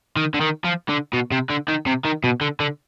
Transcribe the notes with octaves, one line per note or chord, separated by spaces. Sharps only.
D#3
D3
D#3
F3
D3
B2
C3
D3
D#3
C3
D#3
B2
D3
D3